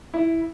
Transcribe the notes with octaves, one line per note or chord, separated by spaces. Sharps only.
E4